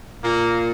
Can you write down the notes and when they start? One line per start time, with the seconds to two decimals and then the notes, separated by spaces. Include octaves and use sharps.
0.24 A#2 A#3